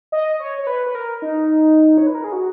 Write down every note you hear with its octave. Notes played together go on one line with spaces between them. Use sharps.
D#5
C#5
C#5
B4
B4
A#4
D#4
C#5
B4
A#4
G#4
F#4